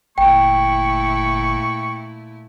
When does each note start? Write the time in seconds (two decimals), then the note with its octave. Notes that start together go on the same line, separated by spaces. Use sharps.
0.18 G1 A#2 A3 E4 G5 C#6